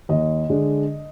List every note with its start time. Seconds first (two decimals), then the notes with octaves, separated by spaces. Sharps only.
0.09 D#2 D#5
0.49 D3 G#3 D4